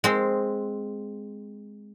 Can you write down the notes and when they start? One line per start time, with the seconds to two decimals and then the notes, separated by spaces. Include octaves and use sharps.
0.04 G#3 C4